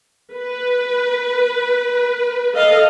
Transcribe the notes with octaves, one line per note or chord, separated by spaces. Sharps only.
B4
A4 D#5 F5